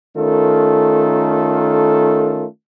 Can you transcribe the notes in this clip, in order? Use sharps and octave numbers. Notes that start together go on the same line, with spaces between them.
D#3 A3 C#4 F4 A4 A#4